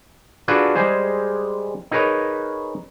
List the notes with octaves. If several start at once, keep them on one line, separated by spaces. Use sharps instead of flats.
D4 F4 F#4 G#4 A4 B4
G3 G#3 G#4 C5
D#4 G#4 A#4 B4 C#5 D#5